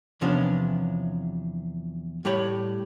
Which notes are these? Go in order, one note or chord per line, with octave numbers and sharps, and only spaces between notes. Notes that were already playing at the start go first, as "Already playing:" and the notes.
E2 C3 F3 B3 C#4 D4
A2 G3 G4 C#5 B5